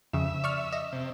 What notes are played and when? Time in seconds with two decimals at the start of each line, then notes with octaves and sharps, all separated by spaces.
0.13 F2 C#3 E5
0.44 D5 C#6 F6
0.72 D#5
0.93 C3